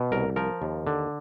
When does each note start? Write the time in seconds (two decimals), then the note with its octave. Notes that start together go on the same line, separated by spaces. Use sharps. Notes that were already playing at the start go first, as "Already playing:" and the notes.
Already playing: B2
0.12 C2 A#4
0.36 F3 A#4
0.62 D#2
0.87 D3